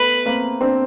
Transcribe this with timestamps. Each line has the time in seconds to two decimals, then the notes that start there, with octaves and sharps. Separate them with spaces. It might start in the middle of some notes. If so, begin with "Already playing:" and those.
Already playing: A3 B3 B4
0.25 A#3 C4
0.61 C4 D4